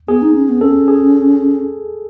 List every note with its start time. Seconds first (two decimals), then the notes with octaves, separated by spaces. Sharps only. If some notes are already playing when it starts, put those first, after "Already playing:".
0.08 B3 G#4
0.22 D#4
0.35 C#4
0.49 B3
0.61 C#4 A4
0.88 G#4